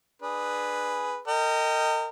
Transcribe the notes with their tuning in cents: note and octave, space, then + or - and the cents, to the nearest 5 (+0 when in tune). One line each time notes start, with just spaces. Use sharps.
D4 +20 G#4 +0 B4 +0
A#4 -35 D#5 +0 G5 +0